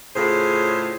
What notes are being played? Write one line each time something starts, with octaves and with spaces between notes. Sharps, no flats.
A2 C#3 F4 G#4 C5